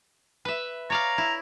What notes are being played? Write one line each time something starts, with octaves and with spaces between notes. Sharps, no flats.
B4 E5
C#5 D5 F5 A#5
E4